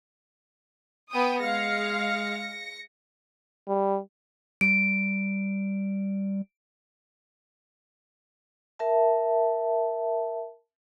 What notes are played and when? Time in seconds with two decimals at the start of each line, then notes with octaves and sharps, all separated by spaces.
1.11 B3 G5 D#6
1.40 G#3 F5 A#6 C#7
3.68 G3
4.61 G3 D7
8.79 A#4 E5 A5